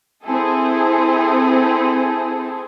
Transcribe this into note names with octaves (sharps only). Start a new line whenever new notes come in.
C4 E4 G#4 A4